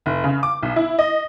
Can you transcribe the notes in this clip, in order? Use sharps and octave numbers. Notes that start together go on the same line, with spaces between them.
F1
C#3
D6
B1
E4
D#5